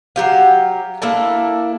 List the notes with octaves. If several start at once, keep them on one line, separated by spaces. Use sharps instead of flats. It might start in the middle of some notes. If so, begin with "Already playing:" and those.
F#3 G4 F5
A#3 D4 E4 A4